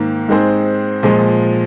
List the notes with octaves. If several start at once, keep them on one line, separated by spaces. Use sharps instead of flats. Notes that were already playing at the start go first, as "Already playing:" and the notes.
Already playing: G#2 D#3 A#3
G#2 G#3 C4 G#4 C5
A#2 F3 G#3